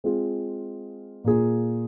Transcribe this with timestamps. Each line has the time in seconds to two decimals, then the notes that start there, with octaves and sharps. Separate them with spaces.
0.04 G#3 C4 F4 G#4
1.24 A#2 A#3 F4 G#4